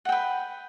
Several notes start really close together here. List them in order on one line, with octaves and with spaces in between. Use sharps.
F#5 G5 B4